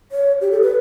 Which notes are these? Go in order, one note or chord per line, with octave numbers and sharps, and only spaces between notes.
C#5
G4
A4
B4